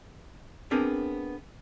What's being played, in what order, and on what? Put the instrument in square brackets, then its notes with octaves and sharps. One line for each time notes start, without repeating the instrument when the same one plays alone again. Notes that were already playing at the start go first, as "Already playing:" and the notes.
[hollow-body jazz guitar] B3 C4 D4 G#4 A#4